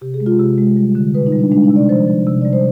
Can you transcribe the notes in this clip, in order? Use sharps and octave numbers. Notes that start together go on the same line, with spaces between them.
C3 G4
G#4
G#3
F4
C3 G4
G#3
G3
D3
B2 B4
D#4
G3
D4
G#3 D4
D#4
C3
D5
F3 C5
F3
C3
G3 D5
C5